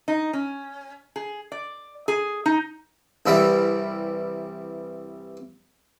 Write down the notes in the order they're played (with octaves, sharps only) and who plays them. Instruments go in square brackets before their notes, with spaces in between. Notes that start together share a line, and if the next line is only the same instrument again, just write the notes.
[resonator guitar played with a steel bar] D#4
C#4
G#4
D5
G#4
D#4
[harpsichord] C2 E3 G3 E5